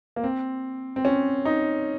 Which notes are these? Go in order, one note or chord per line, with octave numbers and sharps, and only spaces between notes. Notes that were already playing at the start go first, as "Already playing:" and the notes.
A#3
C4
C4
C#4
D#4